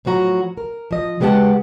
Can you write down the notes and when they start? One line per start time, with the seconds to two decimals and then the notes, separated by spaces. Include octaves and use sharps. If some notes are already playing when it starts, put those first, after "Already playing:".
0.05 A2 F3 F#3 F#4 A#5
0.57 A#4
0.91 F3 D#5
1.20 C#3 G#3 B3 G4 F#5 A5